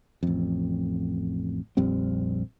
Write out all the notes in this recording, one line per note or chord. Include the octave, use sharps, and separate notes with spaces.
A1 F2
A#1 F2 G3 C4